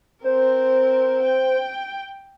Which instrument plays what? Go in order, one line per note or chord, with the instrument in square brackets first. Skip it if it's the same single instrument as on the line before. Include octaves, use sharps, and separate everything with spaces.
[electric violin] C4 A#4 [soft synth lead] C5
[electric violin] G5